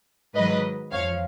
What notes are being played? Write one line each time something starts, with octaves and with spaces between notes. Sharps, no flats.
G#2 D#3 F#3 B4 D#5
F2 F3 C#5 F5